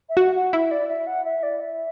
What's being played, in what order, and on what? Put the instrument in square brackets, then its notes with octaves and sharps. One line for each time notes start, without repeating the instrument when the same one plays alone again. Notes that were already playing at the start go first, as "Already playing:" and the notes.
[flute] E5
[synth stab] F#4 [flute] F#5
[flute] F#5
[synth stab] E4 [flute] E5
[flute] D5
E5
F#5
E5
D5
E5